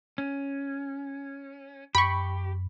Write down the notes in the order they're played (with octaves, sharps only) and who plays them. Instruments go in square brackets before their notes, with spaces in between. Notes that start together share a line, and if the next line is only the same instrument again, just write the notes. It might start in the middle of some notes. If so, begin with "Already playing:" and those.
[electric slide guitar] C#4
[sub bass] F#2 [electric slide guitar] G4 [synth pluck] B5 C#6